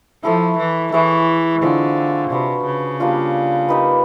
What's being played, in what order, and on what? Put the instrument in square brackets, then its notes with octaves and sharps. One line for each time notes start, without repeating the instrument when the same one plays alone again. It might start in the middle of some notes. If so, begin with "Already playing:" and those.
[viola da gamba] F3 [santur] E4 A4 C#5 E5
[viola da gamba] E3
[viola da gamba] E3 [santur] E4 G#4 C#5
[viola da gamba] D3 [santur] G#3 C4 F4
[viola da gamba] C3 [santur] D4 F#4 B4
[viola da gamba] C#3
[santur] G3 A#3 D4 F4
A#3 D#4 G4 B4